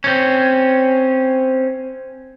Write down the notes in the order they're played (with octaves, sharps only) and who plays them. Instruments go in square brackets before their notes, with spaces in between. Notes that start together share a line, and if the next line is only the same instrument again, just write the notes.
[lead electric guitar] C4 C#4